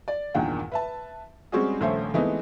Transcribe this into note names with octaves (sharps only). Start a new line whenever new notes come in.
D5
E2 G2 A#2 D#3 F#5 G5
B4 E5 A5
G3 G#3 C4 C#4 F#4 G#4
D#1 A#1 A3 C5 C#5 E5
E3 G#3 A3 B3 C4 D#4